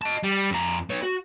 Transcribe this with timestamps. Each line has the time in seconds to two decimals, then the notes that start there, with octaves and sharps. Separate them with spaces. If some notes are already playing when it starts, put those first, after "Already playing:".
0.02 D#5 A5
0.23 G3
0.51 F2 A#5
0.90 B3 C#5
1.02 F#4